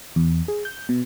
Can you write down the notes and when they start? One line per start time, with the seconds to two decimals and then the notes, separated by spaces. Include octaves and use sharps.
0.16 E2
0.48 G#4
0.65 G6
0.89 B2